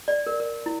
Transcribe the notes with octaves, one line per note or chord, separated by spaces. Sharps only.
D5
A#4
A#4
E4